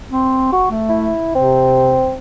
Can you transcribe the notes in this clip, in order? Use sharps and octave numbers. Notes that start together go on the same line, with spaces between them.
C4
F#4
A3
E4
C3 C4